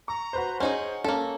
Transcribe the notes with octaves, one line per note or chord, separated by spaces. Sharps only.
A#5 C#6
F#4 B4 C5
C#4 D#4 G#4 C5 F#5
A#3 C#4 A4